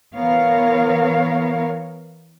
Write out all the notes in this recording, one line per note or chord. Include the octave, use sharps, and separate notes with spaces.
E3 B3 A#4 C#5 F5